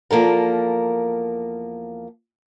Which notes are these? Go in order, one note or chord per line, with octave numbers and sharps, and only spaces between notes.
E2 F3 A#3 A4 A#4